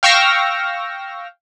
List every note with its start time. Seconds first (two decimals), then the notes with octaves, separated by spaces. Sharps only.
0.03 F5 G5 C#6 E6 F6 A#6